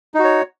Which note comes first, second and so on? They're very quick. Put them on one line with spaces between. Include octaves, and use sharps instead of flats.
D#4 F#4 C#5